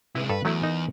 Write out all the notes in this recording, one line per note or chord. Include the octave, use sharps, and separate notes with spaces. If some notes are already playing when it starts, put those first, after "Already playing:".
C3 G#3 E4 B4
G2 A4 B4 F5
E2 F#3 A3 E4
D#4 A#4 D#5